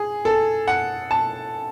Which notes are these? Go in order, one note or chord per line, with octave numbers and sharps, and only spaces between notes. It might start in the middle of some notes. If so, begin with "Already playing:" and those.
Already playing: G#4
A4
F#5
A5